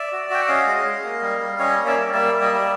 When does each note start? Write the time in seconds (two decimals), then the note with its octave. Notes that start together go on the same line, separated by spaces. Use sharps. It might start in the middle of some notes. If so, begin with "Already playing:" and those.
Already playing: D5 E5
0.12 F#4
0.30 F#4 G5
0.41 F#5
0.48 C#4 D#5 F5
0.67 G#3
0.85 G#3
1.04 A#3
1.21 G3
1.40 G3
1.59 C#4 C#5 D#5
1.78 A#3
1.87 D5 E5
1.96 G3
2.14 A#3 D5 E5
2.32 G3
2.42 D#5
2.51 G3 E5